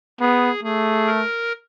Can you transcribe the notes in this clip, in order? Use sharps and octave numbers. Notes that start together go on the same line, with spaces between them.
B3 G#4
A3 G#4
A#4